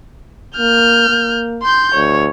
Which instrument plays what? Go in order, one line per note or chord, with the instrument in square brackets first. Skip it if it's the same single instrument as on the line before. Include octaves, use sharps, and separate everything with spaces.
[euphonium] A#3 [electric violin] F6 G6
[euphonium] A#3
[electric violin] C6 G6
[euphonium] D2 [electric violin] C#5